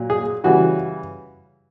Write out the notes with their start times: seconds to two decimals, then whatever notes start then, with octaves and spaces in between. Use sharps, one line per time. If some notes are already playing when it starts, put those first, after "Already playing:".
Already playing: A#2 F#3
0.10 G#4
0.44 C#3 E3 G3 F#4